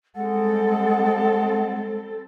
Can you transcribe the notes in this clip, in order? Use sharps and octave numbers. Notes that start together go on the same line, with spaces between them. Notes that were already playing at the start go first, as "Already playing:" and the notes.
G3 G#3 C4 A4 F#5